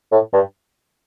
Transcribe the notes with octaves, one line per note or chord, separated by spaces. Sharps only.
A2
G2